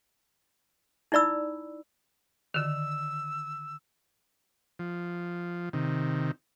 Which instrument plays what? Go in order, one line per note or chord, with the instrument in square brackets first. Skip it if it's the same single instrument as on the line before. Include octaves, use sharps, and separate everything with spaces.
[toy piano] D#4 E4 D5 B5 E6
[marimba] D3 D#3 [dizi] E6
[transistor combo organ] F3
C3 D#3